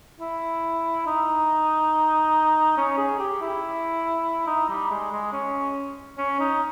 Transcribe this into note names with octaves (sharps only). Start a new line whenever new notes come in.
E4
D#4
C#4
G#4
G4
E4
D#4
G3
G#3
G#3
C#4
C#4
D#4